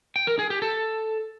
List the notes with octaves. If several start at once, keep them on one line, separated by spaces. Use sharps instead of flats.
G5
A#4
G#4
G4
A4